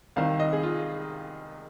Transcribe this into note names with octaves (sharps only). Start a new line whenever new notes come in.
C2 C3 D#3 F5
D#5
G#4
F4